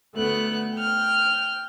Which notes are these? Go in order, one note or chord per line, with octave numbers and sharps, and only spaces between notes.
D2 A3 B3 F#6
G5 F6